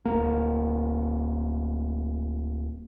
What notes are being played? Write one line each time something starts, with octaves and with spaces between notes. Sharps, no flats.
D1 G#1 A#3